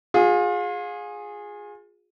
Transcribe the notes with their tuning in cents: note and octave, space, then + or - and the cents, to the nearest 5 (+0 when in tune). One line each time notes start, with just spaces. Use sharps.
F4 +35 G#4 -5